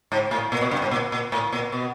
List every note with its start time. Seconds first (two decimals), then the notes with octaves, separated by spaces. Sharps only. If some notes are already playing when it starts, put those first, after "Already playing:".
0.12 G#2
0.31 A2
0.52 A#2
0.61 B2
0.71 G2
0.82 G#2
0.91 A#2
1.12 A#2
1.32 A2
1.52 A#2
1.72 B2